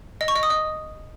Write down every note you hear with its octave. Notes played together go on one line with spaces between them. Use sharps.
D#5
C#6
D#5
D#6
D#5